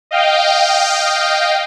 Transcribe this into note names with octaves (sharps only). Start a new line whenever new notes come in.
D#5 F5 G5